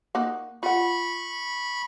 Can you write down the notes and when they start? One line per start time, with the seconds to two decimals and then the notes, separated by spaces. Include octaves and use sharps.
0.15 A#3 D#4 F#4
0.63 F4 F#5 B5 C#6